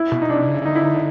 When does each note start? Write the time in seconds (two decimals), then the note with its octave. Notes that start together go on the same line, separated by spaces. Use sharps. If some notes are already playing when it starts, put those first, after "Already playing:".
Already playing: E4
0.12 B2
0.22 D#4
0.30 C3 D4
0.48 C#3
0.61 C#3
0.65 D3 D#4
0.76 E4
0.84 D#4